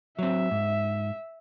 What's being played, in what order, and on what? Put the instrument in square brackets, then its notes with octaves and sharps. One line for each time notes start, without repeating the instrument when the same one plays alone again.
[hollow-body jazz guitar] F#3 C4 [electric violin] E5
[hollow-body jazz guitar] G#2